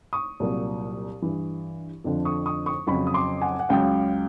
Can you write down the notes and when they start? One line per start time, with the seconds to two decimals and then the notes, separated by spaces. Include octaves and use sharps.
0.13 C#6 D#6
0.40 C2 A#2 F#3
1.22 G2 E3
2.04 F2 D3 F3
2.25 C#6 D#6
2.46 C#6 D#6
2.66 C#6 D#6
2.87 F2 C#3 F#3 B5 C#6
3.07 D#6
3.14 C6 D6
3.41 F#5 G#5
3.59 F#5
3.69 C#2 C#3 F#3 F5 G5